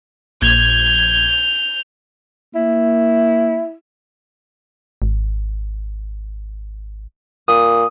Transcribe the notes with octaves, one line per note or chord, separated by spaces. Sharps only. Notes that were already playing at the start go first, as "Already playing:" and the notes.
A#1 G6 G#6 F7
A#3 E4
G#1
A#2 D#6